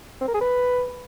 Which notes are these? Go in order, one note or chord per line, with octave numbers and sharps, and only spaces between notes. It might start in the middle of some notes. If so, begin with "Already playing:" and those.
C4
A#4
G#4
B4